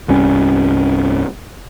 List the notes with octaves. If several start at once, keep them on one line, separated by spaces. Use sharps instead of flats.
C2 G2 G3 C#4